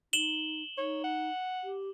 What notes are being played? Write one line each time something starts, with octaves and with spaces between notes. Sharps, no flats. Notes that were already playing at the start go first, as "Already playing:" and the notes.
D#4 E7 F#7 G7
D#4 C#5
F#5
G4